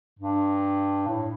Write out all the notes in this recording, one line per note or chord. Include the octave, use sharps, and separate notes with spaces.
G2
A2